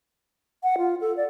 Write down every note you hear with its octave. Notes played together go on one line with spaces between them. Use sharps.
F#5
F4
A4
D5